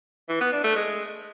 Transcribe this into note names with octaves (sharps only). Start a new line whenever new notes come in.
E3
B3
D4
A3
G#3